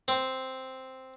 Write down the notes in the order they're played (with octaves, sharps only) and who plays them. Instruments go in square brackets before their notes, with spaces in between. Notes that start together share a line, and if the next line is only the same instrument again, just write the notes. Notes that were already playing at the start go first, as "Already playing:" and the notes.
[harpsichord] C4